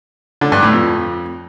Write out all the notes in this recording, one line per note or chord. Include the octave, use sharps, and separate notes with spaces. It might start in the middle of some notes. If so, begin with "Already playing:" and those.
D3
G2
A2
F2